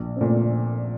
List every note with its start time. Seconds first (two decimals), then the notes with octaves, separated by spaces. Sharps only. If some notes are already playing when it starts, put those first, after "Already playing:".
Already playing: A#1
0.16 A#2 A3 C4